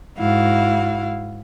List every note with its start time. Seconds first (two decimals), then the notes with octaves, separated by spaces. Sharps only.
0.18 G#2 E4 F#4 F5